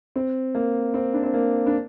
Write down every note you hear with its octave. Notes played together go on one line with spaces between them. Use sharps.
C4
A#3
C4
D4
C4
A#3
D4